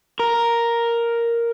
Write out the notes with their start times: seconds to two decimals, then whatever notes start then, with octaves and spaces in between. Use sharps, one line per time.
0.19 A#4